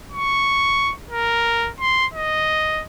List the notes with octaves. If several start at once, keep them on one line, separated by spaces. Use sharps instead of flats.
C#6
A#4
C6
D#5